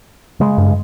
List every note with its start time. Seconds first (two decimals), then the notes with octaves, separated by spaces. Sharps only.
0.40 C#3 G#3
0.58 G2